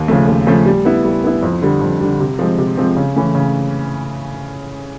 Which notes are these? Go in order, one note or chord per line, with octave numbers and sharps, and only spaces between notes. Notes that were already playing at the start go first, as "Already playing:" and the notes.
Already playing: D#2
C#3 F3 A3
D#2
C#3 F3 A3
G3
B3 E4
G3
B3 E4
F2
D3 G3
F2
D3 G3
C3
F3 G#3 C4
C3
F3 G#3 C4
C#3
E3 A3 C#4
C#3